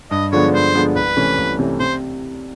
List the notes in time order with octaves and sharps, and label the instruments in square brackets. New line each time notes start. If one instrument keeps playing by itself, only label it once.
[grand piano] G2 [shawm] D#5
[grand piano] D3 F3 G#3 B3 [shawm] C#5
[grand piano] G2 [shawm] C5
[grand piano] D3 F3 G#3 B3
[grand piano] C2 [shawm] B4
[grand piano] C3 E3 A3 C#4
C2
C3 E3 A3 C#4
[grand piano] C3 [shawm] C5